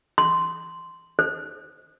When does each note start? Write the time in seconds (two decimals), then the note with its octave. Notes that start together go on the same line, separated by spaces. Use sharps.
0.18 C6
1.19 C5